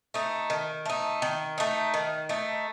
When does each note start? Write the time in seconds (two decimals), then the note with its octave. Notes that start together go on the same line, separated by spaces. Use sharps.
0.14 A3 D#4
0.50 D#3
0.85 A3 D#4
1.22 D#3
1.58 A3 D#4
1.94 D#3
2.29 A3 D#4